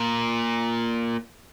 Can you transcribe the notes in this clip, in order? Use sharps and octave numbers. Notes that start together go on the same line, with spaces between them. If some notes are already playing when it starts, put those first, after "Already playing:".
Already playing: A#2